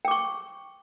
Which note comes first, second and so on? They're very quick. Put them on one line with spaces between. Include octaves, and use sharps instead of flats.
G5 D6 C#6